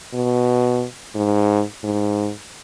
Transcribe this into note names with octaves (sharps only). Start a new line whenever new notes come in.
B2
G#2
G#2